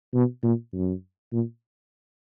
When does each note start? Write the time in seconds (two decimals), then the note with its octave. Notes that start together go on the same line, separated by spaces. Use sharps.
0.14 B2
0.43 A#2
0.73 F#2
1.33 A#2